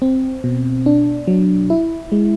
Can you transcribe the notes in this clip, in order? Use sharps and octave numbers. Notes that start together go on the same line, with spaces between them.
C4
B2
D4
F#3
E4
G#3